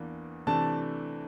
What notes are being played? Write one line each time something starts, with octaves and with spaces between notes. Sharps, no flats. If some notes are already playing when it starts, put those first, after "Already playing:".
Already playing: E2 E3 A#3 D4
C3 E3 A3 D4 A5